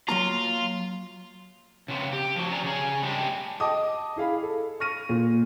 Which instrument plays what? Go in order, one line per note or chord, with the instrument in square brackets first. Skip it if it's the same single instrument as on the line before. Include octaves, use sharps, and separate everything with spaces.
[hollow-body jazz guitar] F#3 A#3 A#5 [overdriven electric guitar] F4
[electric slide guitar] C#3 B3 C4
G4
F3 F#4
F#3 C#4 D5 A#5
C#3 G#4
G3 G#3 C4 D4 G4
[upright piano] D#5 G5 A5 D6 D#6
E4 G#4 F5 B5
A4
C#6 F6 A#6 D#7
A#2